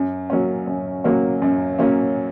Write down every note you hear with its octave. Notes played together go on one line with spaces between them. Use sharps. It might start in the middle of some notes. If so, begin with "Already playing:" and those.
Already playing: F#2
F#3 A#3 C#4
F#2
F#3 A#3 C#4
F#2
F#3 A#3 C#4